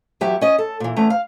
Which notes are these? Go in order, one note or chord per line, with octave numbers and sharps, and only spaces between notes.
E2 F#3 G4 E5
C#4 D#5
A4
A#2 E3
E2 A3 C#4 A#5
F5